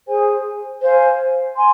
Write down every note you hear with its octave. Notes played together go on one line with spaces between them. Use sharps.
G#4 C5 G#5
C5 F5 G#5
G#5 C6